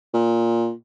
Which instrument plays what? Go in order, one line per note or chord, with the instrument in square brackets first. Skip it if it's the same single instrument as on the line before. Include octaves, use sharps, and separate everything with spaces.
[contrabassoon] A#2